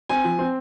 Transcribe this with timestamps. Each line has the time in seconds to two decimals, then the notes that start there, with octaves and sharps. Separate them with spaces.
0.09 C4 G#5
0.24 F3
0.39 C4